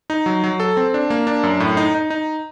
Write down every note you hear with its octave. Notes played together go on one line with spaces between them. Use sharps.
D#4
F#3
F#3
A4
C4
D4
A#3
D4
F#2
A2
D#4
D#4
D#4